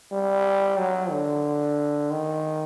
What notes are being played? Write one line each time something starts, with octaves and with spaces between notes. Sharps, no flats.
G3
F#3
D3
D#3